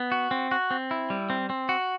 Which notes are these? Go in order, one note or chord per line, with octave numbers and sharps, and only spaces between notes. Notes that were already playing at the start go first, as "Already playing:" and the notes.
Already playing: B3
F#4
C4
F#4
C4
E4
G3
C4
C4
F#4